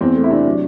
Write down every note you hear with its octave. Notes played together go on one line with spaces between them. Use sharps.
E2 C4
A3
E4
C3 D4
F#3